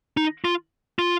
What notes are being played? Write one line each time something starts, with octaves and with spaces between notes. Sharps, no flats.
D#4
F4
F4